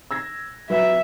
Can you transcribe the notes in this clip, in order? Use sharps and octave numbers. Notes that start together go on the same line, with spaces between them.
E6 G#6 A#6
F#3 B4 E5